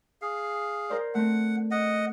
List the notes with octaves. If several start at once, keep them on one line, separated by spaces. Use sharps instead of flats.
G#4 F5
A#4 C5 D5
A3 C4 F#5
D#5 F#5